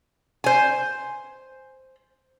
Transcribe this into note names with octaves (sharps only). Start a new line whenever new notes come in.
C5 G#5